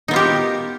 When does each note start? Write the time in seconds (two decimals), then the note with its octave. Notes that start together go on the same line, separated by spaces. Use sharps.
0.08 D#4
0.11 B3
0.13 F4
0.16 G4
0.19 A#4